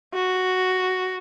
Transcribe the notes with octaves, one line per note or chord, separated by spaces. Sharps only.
F#4